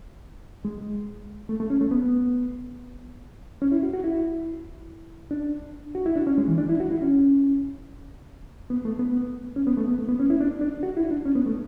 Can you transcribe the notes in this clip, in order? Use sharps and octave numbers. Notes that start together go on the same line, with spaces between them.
G#3
A3
A3
C#4
A3
B3
C#4
E4
F#4
F#4
E4
D4
F#4
E4
D4
C#4
G#3
E3
D4
E4
F#4
E4
C#4
B3
A3
B3
C#4
B3
A3
B3
A3
B3
C#4
E4
D4
D4
F#4
E4
D4
C#4
B3
A3